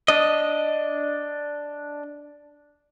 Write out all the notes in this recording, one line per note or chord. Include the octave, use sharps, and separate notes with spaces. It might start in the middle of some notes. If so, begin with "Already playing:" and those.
D4 D#5